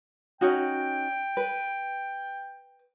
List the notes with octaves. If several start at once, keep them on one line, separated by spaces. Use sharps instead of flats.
C#4 D#4 F#4 G5
B4